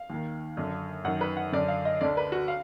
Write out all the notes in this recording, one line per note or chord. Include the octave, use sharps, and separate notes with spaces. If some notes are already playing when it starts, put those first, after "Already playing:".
Already playing: F5
D#2 D#3
F#2 D3
F#2 D#3 F#5
B4
F#5
F#2 D3 D5
F5
D#5
D2 D3 D5
B4
F#4
F5